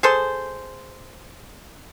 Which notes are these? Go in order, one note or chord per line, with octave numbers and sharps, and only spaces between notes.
G#4 A4 C5